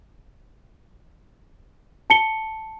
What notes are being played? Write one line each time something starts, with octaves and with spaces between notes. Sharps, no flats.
A5 C#7 G7